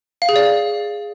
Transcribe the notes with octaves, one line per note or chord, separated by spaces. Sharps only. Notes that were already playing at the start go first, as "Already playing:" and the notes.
F5
G#4
D5